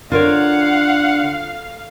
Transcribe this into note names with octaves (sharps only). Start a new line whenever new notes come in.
D3 F4 A#4 C#5 F5 F#5